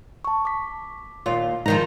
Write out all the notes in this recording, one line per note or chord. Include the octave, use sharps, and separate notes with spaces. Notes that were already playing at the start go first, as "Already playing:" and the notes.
A5 C#6
D6 B6
D#2 A#2 F4
E2 G#2 D#3 F3 A#5